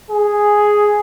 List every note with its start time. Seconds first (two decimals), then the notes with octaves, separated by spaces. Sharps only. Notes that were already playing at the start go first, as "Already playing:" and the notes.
0.11 G#4